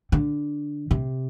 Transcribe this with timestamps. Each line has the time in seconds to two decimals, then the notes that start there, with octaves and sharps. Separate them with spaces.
0.12 D3
0.91 C3